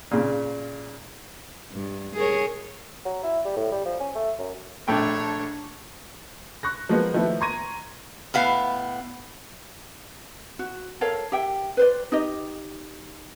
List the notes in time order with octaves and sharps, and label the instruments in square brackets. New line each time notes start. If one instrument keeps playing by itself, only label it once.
[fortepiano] A#2 C#3
[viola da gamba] G2
G#4 A#4 C#5
[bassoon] F#3
E4
G3
A2
G3
F3
C#4
A3
F#2
[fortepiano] A#1 A3 G5 [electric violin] D4 C#5
[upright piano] C#6 F#6 A#6
F3 F#3 G#3 A#3 B3 F#4
D#3 F3 A3 B3 E4
A#5 C6 C#6 G#6 A#6 D#7
[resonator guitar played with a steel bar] A2 B3 F5
[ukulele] F#4
A4 A#4 C#5 F5
G4 E5 G5
B4 C5 D5
D#4 G4 D#5